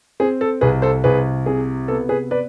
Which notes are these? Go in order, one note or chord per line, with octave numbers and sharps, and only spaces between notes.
C4 G#4
A4
C2 G#4 B4
A4 C5
C2 G#4 B4
C3 G#4
B3 A4
G#4 B4
B4 D5